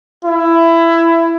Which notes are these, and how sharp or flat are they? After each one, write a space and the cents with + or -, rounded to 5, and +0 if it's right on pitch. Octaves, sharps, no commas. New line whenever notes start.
E4 +15